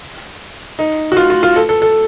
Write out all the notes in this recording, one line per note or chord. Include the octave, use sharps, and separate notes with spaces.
D#4
F#4
F4
F4
F4
A4
A4
A4